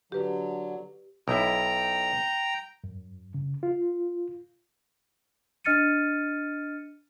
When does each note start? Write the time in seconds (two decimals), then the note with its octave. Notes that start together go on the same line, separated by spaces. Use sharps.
0.12 D3 F#3 G4 B4
1.28 B1 E4 G5 A#5
2.84 F#2
3.34 C#3
3.63 F4
5.64 D4 D#5 F6 A6 C#7 D#7